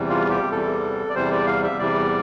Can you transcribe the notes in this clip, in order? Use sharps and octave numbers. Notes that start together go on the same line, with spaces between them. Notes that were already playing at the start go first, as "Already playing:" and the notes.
Already playing: E2 C3 E3 G3
F4
G4
E2 C3 E3 G3 A4
D5
E2 C3 E3 G3 C5
D5
F5
E5
E2 C3 E3 G3 D5